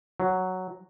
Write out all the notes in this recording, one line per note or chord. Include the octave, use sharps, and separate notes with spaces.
F#3